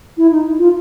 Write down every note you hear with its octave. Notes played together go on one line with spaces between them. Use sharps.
E4
D#4
F4